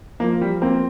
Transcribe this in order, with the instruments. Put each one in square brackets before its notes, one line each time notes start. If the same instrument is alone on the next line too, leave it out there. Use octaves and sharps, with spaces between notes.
[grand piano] F3 [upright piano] A#3
[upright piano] G3
[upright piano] A#3 [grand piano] C4